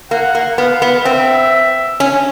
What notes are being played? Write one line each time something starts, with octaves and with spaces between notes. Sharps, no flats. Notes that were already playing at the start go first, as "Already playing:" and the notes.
A#3 F#5
A#3
B3 F5
B3
C4 E5
C#4